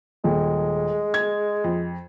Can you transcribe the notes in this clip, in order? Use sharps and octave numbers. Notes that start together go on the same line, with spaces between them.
D#1 G#3
G#6
F2